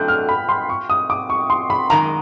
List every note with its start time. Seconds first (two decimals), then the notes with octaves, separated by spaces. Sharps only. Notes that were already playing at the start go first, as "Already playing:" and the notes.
Already playing: D3 F#3 A3 D4 F#6 G6
0.08 F6
0.29 B5
0.49 C6
0.69 C#6
0.90 D#6
1.10 D6
1.30 C#6
1.50 C6
1.70 B5
1.90 F#2 D#3 G#3 A#5